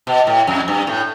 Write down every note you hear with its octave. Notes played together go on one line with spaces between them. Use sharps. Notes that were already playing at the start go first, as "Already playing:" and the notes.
B2
A2
F2
G2
A2